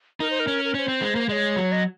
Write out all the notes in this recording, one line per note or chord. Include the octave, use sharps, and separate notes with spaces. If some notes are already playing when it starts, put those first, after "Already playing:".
D#4 A#4
C5
A#4
C#4
A#4
C#4 C5 C#5
C4
G#3
A#3
G#3 C#5 D#5
F#3
D#5